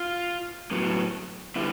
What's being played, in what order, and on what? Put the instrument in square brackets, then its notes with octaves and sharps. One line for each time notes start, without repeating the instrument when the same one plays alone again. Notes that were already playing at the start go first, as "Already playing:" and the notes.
Already playing: [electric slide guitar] F4
A2 F#3 B3
D3 G3 B3 E4